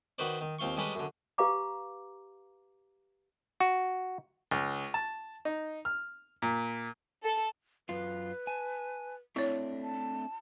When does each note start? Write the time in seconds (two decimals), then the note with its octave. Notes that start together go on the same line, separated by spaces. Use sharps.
0.18 D#3 F#4 B4 C5 D5
0.41 D#3
0.59 D#2 C4 F4 C6 C#6
0.77 G3 G#3 C#4 A4 B4 D#5
0.95 F#2 D3
1.38 G4 B4 F5 A#5 D6
3.60 F#4
4.51 C#2
4.94 A5
5.45 D#4
5.85 F6
6.42 A#2
7.24 A4
7.89 F#2 F4 B4
8.47 G#5 A5
9.36 A3 C4 D4 E4 C#5
9.82 A5